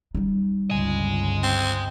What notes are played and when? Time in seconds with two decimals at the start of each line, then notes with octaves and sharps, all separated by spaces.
0.15 G3 D#4
0.70 G1 C#2 D#5 G#5
1.43 C4